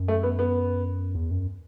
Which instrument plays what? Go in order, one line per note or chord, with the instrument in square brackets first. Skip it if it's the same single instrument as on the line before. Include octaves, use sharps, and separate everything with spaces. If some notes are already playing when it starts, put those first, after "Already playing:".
Already playing: [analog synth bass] F#2
[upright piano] A3
B3
B3
[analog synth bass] E2
F#2